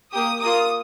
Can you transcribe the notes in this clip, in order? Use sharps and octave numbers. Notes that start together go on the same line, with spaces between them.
A#3 G4 D#6
A#3 F4 D#6